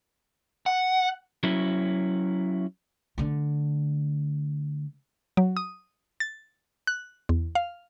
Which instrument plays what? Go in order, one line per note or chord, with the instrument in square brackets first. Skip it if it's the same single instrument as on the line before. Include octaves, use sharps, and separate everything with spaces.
[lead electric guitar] F#5
[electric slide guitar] F#3 C#4 E4
[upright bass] D3 A3
[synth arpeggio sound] F#3
D#6
A6
F#6
E2
F5